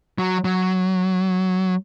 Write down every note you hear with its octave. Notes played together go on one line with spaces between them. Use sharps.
F#3
F#3